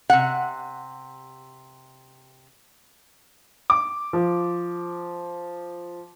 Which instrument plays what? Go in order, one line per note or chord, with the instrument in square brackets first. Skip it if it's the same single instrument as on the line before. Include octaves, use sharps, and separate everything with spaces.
[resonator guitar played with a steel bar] C3 F#5
[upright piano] D6
F3